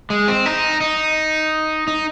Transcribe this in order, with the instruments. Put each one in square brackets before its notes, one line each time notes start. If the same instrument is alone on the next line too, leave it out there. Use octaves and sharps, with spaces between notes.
[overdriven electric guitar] G#3
C4
D#4
D#4
D#4